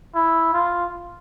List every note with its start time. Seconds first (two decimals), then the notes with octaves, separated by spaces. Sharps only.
0.15 E4
0.53 F4